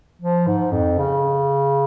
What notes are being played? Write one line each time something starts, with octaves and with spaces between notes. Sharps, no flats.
F3
G#2
F2
C#3